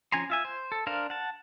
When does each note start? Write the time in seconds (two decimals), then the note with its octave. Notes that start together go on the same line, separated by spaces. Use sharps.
0.12 F3 C#4 G#5 A#5 C6
0.30 F4 E5 G#5
0.45 C5
0.72 A4
0.87 D4 A#4 C5 F5
1.10 F#5 A5